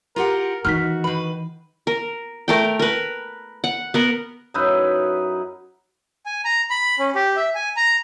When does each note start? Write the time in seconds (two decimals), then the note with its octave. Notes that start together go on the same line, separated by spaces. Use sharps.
0.16 F4 G4 A#4 F#5
0.65 D#3 E3 D#4 F#4 F6 B6
1.04 D#3 B4 B5
1.87 A#4
2.48 A3 A#4 G5
2.79 A#4 B4
3.64 F#5
3.94 B3 A#4 F#5
4.54 F#2 D#4 E4 B4
6.26 G#5
6.45 A#5
6.70 B5
6.99 C#4
7.15 G4
7.37 E5
7.55 G#5
7.77 A#5